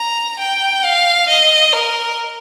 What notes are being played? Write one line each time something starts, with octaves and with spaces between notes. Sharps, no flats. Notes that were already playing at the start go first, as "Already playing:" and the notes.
Already playing: A#5
G5
F5
D#5
A#4